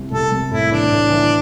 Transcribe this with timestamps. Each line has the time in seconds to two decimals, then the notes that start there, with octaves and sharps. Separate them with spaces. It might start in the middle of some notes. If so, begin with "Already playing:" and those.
Already playing: C2 C3
0.12 C2 A4
0.32 C2
0.51 A2 E4
0.71 E3 D4
0.91 A2
1.10 E3